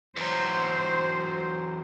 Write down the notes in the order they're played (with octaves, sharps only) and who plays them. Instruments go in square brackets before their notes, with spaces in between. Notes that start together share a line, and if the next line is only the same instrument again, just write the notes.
[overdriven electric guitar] E2 F#3 [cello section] C5